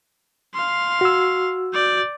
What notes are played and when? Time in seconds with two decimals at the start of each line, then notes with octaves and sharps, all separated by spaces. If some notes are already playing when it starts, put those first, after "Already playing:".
0.54 F5 C6
1.01 F#4 E6
1.74 D5 G6